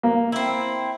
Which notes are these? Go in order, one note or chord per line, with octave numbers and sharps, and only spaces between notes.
A#3
C4 E4